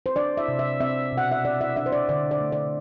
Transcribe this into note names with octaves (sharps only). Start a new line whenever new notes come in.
C5
D4 D5
E5
C3
E5
C4 E5
B2
F#5
E5
D4 D5
E5
D4 E5
C5
D5
D3 D5
D5
A3
D5